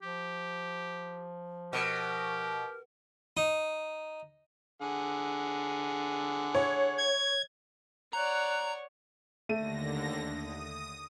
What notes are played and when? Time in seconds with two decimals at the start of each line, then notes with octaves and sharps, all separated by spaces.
0.02 F3 G4
1.73 B2 G4 A#4
3.37 D#4
4.82 D3 G#4 F#5
6.55 C#5
6.98 G#6
8.13 C#5 D5 F#5 A#5 F#6
9.49 D#2 D3 A3 A#6 D#7
10.30 D#6